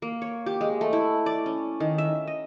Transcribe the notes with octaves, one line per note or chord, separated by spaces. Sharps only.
A#3
C#5
G4
G#3
A3
E4
D5
C#4
D#3
E5
D#5